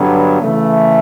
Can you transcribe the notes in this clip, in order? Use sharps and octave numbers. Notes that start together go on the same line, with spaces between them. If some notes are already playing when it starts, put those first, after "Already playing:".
Already playing: G2 D3 F#3 B3
C#3 E3 A3